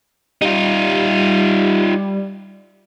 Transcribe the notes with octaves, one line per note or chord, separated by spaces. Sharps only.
G3 D#4 F4